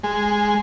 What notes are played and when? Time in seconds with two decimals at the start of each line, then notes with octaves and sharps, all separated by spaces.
0.04 G#3